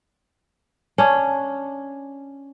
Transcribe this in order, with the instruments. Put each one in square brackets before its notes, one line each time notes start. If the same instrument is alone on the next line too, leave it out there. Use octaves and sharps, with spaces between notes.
[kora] C#4 D4